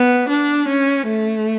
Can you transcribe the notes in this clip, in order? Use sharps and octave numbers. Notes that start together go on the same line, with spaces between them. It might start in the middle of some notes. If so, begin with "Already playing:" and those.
Already playing: B3
D4
C#4
A3